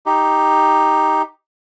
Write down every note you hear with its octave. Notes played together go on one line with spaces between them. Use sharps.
D#4 G4